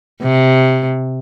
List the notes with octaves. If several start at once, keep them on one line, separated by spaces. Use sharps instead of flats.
C3